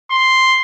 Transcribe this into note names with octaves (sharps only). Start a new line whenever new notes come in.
C6